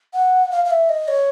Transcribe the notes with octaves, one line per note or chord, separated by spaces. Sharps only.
F#5
F5
F5
E5
D#5
C#5